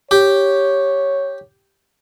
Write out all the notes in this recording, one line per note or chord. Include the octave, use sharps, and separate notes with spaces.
G4 C#5